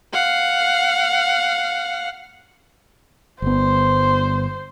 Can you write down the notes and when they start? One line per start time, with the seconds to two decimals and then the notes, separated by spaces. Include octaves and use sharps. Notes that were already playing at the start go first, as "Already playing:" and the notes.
0.13 F5 F#5
3.42 G1 B3 C5